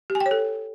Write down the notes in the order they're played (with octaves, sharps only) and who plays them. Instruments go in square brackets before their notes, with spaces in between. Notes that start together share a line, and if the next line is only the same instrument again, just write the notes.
[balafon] G4
G#5
G5
C#5
A4